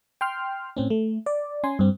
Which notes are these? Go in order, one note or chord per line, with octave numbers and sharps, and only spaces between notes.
G5 C6 F6
A2 C4 C#4
A3
D5
C#4 G#5 C6
G2 C4